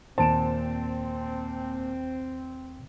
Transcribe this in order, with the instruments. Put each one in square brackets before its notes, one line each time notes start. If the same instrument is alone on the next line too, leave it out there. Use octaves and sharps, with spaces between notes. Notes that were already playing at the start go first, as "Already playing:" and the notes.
[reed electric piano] D#2 C5 [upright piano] A#2 D7 E7 [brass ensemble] C4 [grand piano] A5